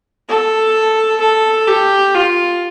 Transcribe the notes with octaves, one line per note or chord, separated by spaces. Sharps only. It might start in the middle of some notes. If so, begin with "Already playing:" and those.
A4
A4
G4
F4